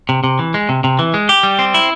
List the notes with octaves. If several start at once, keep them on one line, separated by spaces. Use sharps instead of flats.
C3
C3
E3
G#3
C3
C3
E3
G#3
G4
G3
C4
E4